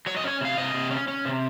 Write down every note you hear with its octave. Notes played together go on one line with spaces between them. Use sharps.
F#3 C#5
D#5
C#4 C#5
C3 F5
C3 D#5
C3
C#4
C#4
C3